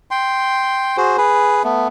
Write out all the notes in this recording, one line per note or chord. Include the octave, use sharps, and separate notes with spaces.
G5 C6
F#4 G#4 C5
G#4 B4
A3 B3